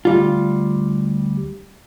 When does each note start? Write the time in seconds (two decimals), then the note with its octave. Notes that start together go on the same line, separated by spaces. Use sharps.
0.05 D2 G3 F4